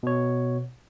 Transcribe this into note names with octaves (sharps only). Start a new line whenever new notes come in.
B2 C#5